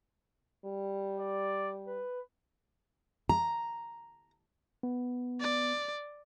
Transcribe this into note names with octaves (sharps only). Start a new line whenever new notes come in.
G3
D5
B4
A#5
B3
D5